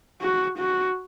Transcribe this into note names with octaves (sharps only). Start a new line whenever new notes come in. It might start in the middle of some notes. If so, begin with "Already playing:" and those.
F#4
F#4